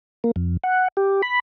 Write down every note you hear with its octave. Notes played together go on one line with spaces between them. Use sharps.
A#3
F2
F#5
G4
B5